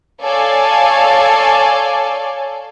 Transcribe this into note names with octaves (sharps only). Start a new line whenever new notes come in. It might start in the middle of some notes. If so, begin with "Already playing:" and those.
A4 C#5 D5 F5 G#5 A5